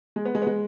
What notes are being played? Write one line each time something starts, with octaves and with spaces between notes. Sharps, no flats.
G#3
B3
G#3
B3
G#3